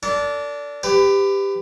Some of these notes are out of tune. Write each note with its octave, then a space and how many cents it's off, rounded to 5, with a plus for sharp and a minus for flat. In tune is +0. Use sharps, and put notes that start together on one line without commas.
D4 -20 A4 +45
G4 +10 B4 +30